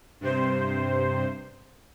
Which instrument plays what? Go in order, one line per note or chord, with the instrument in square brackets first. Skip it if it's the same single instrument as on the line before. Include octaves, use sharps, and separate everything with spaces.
[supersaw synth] G2 C3 C5